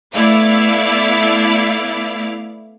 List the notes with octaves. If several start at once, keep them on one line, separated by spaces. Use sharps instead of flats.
A3 B3 E4 D5 F5